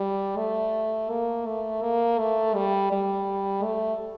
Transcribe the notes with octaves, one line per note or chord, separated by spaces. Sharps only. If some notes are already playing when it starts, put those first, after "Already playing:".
Already playing: G3
A3
A#3
A3
A#3
A3
G3
G3
A3